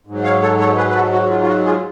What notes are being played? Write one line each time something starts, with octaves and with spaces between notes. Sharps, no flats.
G#2 F#3
C#5 F5
A4 C#5
A4 C#5
G#4 B4
B4
F#4 A4
F#4
F4
F4
F#4
F4 G#4